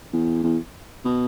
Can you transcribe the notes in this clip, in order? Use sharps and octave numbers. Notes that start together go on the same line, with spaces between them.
E2
E2
B2